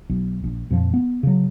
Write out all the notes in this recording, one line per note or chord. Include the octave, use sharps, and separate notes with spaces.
B1
A#1
F2 A#2 F3
B3
C#3 F#3